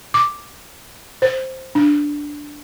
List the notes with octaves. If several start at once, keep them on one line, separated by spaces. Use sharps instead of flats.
D6
C5
D4